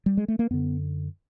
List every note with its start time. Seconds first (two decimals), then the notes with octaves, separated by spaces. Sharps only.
0.06 G3
0.17 G#3
0.28 A3
0.39 A#3
0.51 F#2 D3 B3